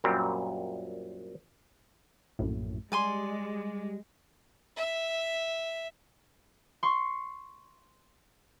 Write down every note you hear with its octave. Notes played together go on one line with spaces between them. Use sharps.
F#2 A#2 G3 C4
A#1 F#2 A2
G3 G#3 D5 G#5 C6
E5
C6 C#6